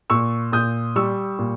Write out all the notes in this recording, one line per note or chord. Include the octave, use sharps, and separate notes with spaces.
A#2 C#6 E6
A#2 D#6 G6
G3 C#6 E6
A#2